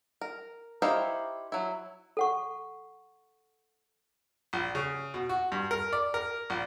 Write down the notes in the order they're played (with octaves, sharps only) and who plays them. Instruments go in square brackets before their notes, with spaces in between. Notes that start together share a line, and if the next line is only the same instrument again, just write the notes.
[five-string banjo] A#4
D#4 E4 G4 C5 F5
F#3 E4
[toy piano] A4 F#5 C#6
[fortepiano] A#1
C#3
B2
F#4
G2
A#4
D5
A#4
A#1